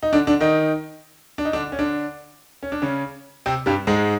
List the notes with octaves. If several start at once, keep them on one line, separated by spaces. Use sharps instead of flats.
D#4
D3 D4
D3 D4
D#3 D#4
D4
D#4
D3 D4
C#4
D3 D4
C#4
D4
C#3 C#4
C3 C4
G2 G3
G#2 G#3